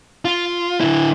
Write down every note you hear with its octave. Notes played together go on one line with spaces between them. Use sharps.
F4
D3 E4